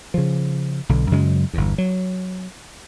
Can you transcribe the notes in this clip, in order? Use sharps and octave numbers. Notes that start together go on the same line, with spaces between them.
C#3 F3
B1 D3
F#2 C#3 F#3 G#3
G1 E2
F#3